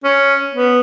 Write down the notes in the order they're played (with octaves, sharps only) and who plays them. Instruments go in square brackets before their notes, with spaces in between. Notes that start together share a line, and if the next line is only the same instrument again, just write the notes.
[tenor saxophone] C#4
B3